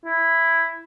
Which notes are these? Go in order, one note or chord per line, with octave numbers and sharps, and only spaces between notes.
E4